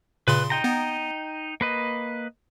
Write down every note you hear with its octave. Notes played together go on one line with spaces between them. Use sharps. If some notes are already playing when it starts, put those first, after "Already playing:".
A#2 C#3 B4 C6
D#4 G5 A#5
B3
A#3 B4 D#5